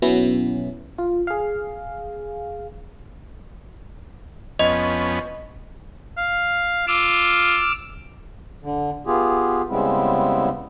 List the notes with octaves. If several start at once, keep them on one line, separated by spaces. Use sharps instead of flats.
B2 F#3 B3 C#4 E4
F4
G#4 F5
F2 B3 C#4 D#5
F5
F4 D6 E6 F6
D3
B3 F4 G4 G#4
C#3 G3 G#3 B3 C4 E4